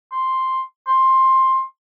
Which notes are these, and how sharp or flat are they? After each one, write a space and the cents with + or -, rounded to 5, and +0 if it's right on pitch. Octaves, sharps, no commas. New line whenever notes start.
C6 +0
C6 +15